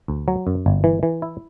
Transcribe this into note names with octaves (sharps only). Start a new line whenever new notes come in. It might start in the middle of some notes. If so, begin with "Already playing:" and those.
D2
F#3
F#2
G1
E3
E3
E4